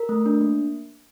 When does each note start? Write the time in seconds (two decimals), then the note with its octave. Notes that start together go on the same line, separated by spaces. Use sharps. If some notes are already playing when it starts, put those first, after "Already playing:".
Already playing: A#4
0.09 A3
0.26 D4
0.41 A#3